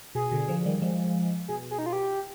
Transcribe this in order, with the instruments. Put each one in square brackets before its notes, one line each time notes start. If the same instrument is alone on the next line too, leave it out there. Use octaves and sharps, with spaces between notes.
[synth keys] B2 [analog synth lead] G#4
[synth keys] B2 D3
D3 F3
D#3 G3
F3 G#3
[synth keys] B2 [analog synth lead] G#4
[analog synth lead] G#4
D#4
F4
G4